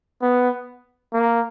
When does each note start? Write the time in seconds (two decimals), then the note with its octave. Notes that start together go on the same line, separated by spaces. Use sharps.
0.22 B3
1.14 A#3